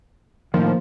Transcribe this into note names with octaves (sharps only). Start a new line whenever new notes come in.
A2 D#3 F3 A#3